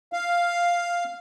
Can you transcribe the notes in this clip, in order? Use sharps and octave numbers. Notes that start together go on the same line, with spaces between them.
F5